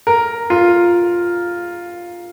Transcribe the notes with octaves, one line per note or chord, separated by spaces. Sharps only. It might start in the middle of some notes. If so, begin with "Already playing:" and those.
A#4
F4